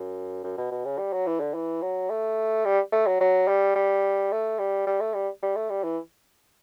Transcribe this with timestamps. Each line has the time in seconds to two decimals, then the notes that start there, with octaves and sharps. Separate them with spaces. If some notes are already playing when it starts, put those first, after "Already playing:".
Already playing: F#2
0.44 F#2
0.58 B2
0.71 B2
0.85 C#3
0.98 G3
1.13 F#3
1.27 E3
1.40 D3
1.54 E3
1.82 F#3
2.10 A3
2.65 G3
2.92 A3
3.07 F#3
3.21 F#3
3.48 G3
3.75 G3
4.32 A3
4.59 G3
4.87 G3
5.00 A3
5.14 G3
5.43 G3
5.56 A3
5.70 G3
5.84 E3